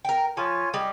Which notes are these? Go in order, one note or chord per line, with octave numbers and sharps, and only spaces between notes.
A#4 G5
F3 F4 C#5 G#5
G3 D#5